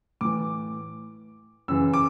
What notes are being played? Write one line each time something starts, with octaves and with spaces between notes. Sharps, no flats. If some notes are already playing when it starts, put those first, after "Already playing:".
A2 E3 D6
F#2 C#3 E3 E6
D6